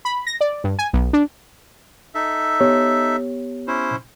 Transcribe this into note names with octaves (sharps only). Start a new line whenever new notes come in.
B5
A#6
D5
G2
G#5
B1
D4
D#4 A4 E5
B3 G4 C#5
C#4 E4 C5